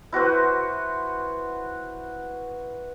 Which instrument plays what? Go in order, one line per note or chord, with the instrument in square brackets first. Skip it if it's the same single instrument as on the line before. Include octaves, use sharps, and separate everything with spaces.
[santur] E4 F#4 B4 C5